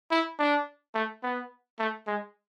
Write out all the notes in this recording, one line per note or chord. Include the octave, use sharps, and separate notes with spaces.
E4
D4
A3
B3
A3
G#3